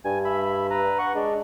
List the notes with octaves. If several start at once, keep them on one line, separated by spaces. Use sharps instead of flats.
G2 G#5
E5 B5
B4 A#5
F#5 C#6
G#3 D4